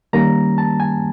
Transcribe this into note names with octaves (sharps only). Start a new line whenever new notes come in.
D#3 G3 A#3 C#4 A#5
A5
G#5